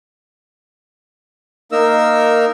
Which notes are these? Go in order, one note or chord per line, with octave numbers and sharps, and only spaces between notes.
A#3 D#4 A#4 E6